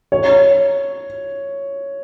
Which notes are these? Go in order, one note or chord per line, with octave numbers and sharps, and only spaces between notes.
C#5